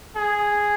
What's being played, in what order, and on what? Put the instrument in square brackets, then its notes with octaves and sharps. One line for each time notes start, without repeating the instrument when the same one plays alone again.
[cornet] G#4